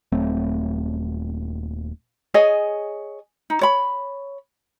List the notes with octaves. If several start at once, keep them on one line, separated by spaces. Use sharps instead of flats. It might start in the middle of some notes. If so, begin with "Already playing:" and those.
D#1 F#3 A3 C4
G#4 C#5 D#5 G#5
D#4
C#5 B5